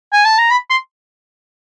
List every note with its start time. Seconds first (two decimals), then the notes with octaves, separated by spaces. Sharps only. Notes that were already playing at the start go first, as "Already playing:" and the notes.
0.13 G#5
0.25 A5
0.38 A#5
0.50 B5
0.70 C6